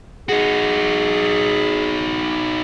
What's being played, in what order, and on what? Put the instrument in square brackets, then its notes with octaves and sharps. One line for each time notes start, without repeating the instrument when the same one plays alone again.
[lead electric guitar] D#4 F#4 [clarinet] G#4